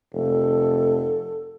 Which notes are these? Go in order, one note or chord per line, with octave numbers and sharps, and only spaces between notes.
F1 A4